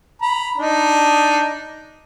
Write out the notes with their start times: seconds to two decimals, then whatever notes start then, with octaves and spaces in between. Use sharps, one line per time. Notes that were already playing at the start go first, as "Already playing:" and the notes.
0.22 A#5 B5
0.58 D4 D#4